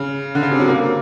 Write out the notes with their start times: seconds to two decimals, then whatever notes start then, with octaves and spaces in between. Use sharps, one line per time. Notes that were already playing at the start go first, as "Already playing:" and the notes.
Already playing: C#3
0.35 D3
0.43 C#3
0.51 C3
0.59 F#3
0.68 A#3